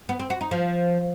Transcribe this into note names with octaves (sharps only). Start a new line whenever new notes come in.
B3
C4
F#4
D#4
F3